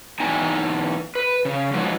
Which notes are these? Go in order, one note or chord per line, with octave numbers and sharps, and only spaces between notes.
E2 D#4 G5 G#5
B4
C#3
F3 F#3 G#3 D#4 B4